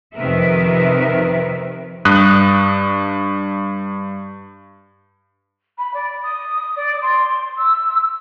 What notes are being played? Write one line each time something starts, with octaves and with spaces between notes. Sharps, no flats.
F2 C3 D#3 A#4 B4 E5
G2 D#6 F#6
B5
D5
D#6
D5
C6
E6